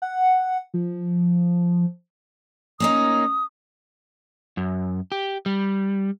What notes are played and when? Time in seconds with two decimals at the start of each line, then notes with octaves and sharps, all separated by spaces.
0.02 F#5
0.74 F3
2.80 A#3 C#4 D#4 D#6
4.57 F#2
5.12 G4
5.46 G3